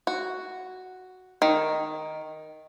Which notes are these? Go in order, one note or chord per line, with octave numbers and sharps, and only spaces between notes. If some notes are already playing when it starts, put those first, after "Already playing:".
F#4
D#3